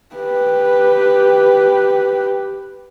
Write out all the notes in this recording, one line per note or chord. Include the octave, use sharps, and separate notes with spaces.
G4 B4